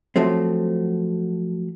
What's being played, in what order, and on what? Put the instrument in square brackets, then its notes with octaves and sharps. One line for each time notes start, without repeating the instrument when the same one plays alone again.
[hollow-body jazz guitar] F3 F#3 A3 C4